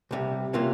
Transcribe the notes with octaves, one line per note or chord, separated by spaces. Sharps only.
C2 C3 G3
C3 E3 A#3 C#4 F4